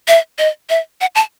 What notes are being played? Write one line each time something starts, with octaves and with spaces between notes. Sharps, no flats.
E5
D#5
E5
F#5
A5